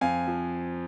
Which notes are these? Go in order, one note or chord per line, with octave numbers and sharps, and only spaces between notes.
F2 F5 G#5
F3